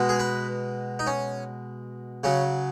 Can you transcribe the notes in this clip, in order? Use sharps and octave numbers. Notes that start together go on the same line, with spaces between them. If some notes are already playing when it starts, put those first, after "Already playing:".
Already playing: B2 G#3
G#4
B4
D#4
C#4
C#3 F#3 C#4